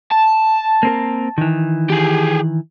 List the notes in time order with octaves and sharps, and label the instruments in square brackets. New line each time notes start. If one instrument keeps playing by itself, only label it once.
[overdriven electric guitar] A5
[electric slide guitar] A#3 C4 A#4
D#3 E3
[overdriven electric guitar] G4 G#4